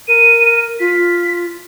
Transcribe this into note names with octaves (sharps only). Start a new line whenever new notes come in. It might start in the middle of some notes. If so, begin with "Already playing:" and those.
A#4 D#7
F4 B6